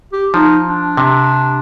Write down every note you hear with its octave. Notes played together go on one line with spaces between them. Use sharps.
G4
F3 D#4
D4
C3